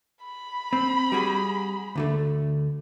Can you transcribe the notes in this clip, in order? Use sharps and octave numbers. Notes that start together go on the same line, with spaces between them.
B5
C4
G3 F#4 G#4
D2 D3 A3